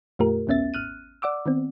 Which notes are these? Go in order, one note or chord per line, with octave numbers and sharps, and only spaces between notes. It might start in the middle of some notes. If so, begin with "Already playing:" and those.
F2 A#2 A3 F4 G4 A#4
A#1 D#2 B3 C#4 E5 A6
G#1 F6 F#6 D#7
D5 F#5 D6 E6
D#3 B3 C4